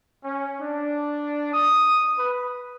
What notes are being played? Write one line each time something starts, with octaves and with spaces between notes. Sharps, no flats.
C#4
D4
D#6
B4